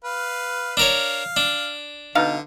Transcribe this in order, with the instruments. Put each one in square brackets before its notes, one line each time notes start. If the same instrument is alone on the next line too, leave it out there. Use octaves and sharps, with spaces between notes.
[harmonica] B4 F5
[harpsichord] D4 A#4 C#5 [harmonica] F5
[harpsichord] D4
[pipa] B2 D#4 F5 [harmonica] D3